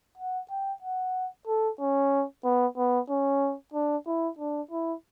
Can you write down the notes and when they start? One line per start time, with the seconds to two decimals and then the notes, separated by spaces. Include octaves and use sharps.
0.18 F#5
0.50 G5
0.82 F#5
1.47 A4
1.80 C#4
2.44 B3
2.77 B3
3.09 C#4
3.74 D4
4.07 E4
4.39 D4
4.71 E4